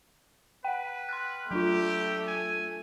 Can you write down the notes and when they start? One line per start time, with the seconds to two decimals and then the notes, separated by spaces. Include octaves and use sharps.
0.64 B4 F#5 G5
1.09 C6 F6 F#6
1.51 F#3 A3 D4 F4 G4
2.28 G#5